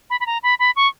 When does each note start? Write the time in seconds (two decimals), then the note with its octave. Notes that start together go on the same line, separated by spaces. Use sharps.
0.10 B5
0.20 B5
0.26 A#5
0.43 B5
0.59 B5
0.76 C#6